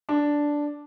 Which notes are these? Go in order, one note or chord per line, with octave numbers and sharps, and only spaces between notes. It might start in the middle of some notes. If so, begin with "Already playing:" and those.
D4